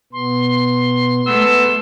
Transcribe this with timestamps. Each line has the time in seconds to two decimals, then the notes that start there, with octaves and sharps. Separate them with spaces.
0.13 B2 B3 C6
1.27 A3 B3 E6